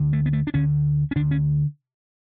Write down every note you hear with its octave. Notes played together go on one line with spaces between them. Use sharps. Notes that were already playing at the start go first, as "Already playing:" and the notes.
Already playing: D2 D3
A3
B3
A3
D4
D2 D3 C#4
C#4
D2 D3 D4
C#4